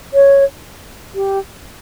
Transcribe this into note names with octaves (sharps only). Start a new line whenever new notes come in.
C#5
G4